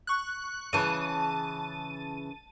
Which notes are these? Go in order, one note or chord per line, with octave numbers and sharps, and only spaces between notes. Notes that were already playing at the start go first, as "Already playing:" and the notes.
C#6 F#6
C#3 E3 A5 D#7